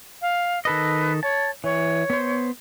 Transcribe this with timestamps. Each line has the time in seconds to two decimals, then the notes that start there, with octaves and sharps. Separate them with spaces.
0.22 F5
0.65 D#3 A4 B4 D#5
1.23 C#5 A5
1.64 E3 C#5
2.10 B3 C5